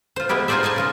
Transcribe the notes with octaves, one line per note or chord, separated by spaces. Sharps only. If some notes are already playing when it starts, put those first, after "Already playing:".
F4 C5
G#3 B3 E4 G4
D#4 F4 G#4 C5 D5 E5
D#5 F5 G#5 A5
C#3 F4 D#5